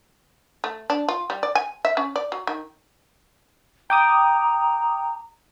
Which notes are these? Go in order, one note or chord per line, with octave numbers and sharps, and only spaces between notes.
A3
D4
F4
G3
D5
G#5
E5
C#4
D5
F#3
D#3
G5 A#5 D6 D#6